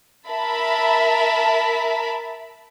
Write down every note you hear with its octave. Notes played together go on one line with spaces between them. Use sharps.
A#4 E5 A5 B5